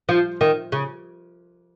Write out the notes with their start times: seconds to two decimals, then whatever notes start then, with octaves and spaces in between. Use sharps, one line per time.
0.09 F3
0.41 D#3
0.72 C#3